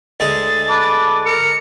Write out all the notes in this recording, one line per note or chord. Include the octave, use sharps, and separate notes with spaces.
D2 G#3 G#4 A6
B4 A5 D6
A#4 C#7